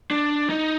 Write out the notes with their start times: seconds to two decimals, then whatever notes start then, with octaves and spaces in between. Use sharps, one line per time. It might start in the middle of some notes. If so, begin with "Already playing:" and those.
0.11 D4
0.49 D#4